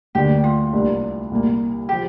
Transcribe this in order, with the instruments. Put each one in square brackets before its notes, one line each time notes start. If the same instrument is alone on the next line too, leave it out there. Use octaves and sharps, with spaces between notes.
[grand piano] D2 D3 G3 A#3 D4 [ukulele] G4
[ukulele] F4
[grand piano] C2 C3 A#3 D4
C2 A#2 A#3
[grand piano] C3 F3 [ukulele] G4